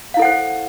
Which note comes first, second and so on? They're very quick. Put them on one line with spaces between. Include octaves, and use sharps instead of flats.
F5 E4 A4 F#5 C5